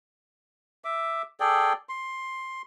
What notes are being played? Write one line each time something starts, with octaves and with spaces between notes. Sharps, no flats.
E5 D6
G#4 A4 D5 G5
C6